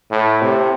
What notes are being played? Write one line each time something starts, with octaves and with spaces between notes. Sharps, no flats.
A2
C3